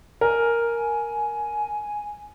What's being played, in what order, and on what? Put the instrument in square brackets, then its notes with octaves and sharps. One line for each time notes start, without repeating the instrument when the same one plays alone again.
[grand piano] A#4 [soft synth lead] G#5